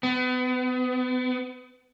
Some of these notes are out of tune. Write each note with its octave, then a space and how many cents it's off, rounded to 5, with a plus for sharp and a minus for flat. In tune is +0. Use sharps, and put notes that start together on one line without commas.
B3 +35